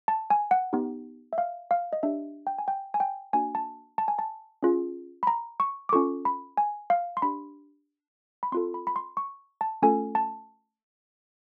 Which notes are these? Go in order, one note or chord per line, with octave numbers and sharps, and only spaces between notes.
A5
G#5
F#5
B3 D#4 G4
E5
F5
F5
D#5
D4 G4 E5
G5
G#5
G5
G#5
G5
A#3 D4 F#4 G#5
A5
A5
G#5
A5
C#4 F4 G#4
B5
A#5
C#6
D6
C#4 F4 A4 C#6
B5
G#5
F5
C6
D4 G4 B5
B5
C4 F4 A4 C6
B5
B5
C6
C#6
A5
A3 C#4 F4 A4 G#5
A5